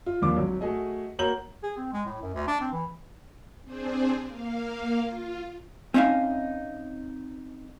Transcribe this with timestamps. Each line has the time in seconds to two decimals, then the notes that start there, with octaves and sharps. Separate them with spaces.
0.06 F4
0.22 D#2 F3 A#3 D4 D6
0.36 G#1 F#3
0.61 A3 F#4 G#4 D#5
1.19 A#3 F#4 C#5 A#5 G6 F#7
1.63 G#4
1.77 C4
1.93 G#3
2.06 A2
2.22 F#2
2.34 D2
2.47 D4
2.61 C4
2.72 E3
3.65 C4 D4 G#4 C5
4.27 A#3 F5
5.02 F4
5.94 C4 C#4 D#4 E5 F5